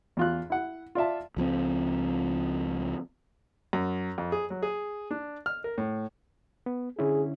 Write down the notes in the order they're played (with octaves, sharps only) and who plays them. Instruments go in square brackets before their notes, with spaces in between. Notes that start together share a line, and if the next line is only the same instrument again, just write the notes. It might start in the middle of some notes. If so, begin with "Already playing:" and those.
[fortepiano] E2 F4 F#6
E4 F#5
F4 D5 E5 A5
[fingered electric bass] C#2 F3 G3 C4
[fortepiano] F#2
F2
G#4
F#3
G#4
D4
F6
A#4
A2
[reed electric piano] B3
[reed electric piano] D3 C#4 E4 [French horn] G#4